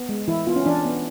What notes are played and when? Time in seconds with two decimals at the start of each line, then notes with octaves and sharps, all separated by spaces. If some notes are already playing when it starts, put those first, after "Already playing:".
Already playing: B3
0.09 G#3
0.28 E3 E4
0.47 B3 F4
0.56 C#4
0.66 E3 D4
0.85 B3